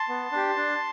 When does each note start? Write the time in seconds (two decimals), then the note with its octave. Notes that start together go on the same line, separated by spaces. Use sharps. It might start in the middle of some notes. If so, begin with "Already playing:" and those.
Already playing: A5 C6
0.09 B3
0.32 D4 G4
0.56 D4